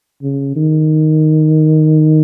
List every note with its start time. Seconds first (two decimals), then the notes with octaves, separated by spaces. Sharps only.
0.22 C#3
0.56 D#3